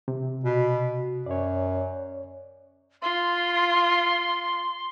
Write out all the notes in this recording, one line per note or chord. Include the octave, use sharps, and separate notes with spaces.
C3
B2
F#2 C#5 D5
F4 C6